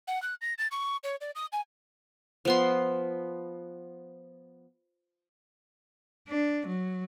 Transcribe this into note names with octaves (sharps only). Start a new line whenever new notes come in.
F#5
F#6
A#6
A6
C#6
C#5
D5
D#6
G#5
F3 B3 C6
D4
F#3